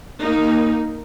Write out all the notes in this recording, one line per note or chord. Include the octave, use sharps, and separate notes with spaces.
A#3 D#4